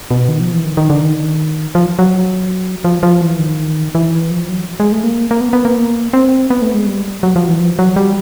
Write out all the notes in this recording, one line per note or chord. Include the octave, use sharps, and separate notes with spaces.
B2
D#3
F3
E3
D#3
D#3
D3
D#3
F3
F#3
F3
F3
E3
D#3
E3
F3
F#3
G#3
A3
A#3
A#3
B3
B3
A#3
C4
B3
A3
G#3
G3
F#3
F3
E3
F3
F#3
G3